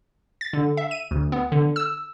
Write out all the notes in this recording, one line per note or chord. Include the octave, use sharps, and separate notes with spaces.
A6
D3
E5
D#7
D2
B3
D3
E6